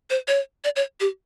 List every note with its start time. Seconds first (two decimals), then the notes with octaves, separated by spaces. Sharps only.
0.10 C5
0.28 C#5
0.64 D5
0.76 C#5
1.00 G4